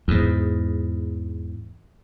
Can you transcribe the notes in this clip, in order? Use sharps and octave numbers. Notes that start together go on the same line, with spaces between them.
E2 G#2